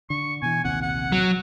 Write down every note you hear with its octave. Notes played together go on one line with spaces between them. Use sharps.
D3 C#6
B2 E3 G#5
A#1 D#2 C3 F#5
F#5
F#3